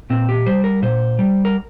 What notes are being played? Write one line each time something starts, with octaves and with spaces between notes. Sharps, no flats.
A#2 C4
G4
G3 C5
A#4
A#2 C5
G3
A#4